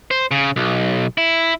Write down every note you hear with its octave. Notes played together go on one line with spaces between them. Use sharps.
C5
C#3
B1
E4